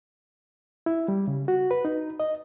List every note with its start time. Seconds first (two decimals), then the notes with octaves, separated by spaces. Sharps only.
0.86 E4
1.08 G3
1.28 C#3
1.48 F#4
1.71 B4
1.85 D#4
2.20 D#5